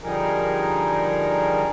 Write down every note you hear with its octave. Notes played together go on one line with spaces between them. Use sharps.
D3 F3 G3 D#4 G#4 A#4